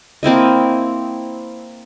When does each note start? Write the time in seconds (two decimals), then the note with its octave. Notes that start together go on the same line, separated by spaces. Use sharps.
0.23 A#3 C4 E4 D#5